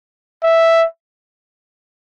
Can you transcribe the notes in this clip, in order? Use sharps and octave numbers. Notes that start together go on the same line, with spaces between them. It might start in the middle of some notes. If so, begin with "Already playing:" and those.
E5